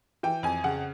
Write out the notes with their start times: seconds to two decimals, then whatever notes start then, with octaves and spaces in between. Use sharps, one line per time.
0.23 E3 G5
0.43 F2 G#5
0.64 C#3 F#5